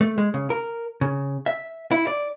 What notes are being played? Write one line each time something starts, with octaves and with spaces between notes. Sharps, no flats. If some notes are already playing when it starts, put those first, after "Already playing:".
A3
G#3
C#3
A#4
C#3
E5
E4
D5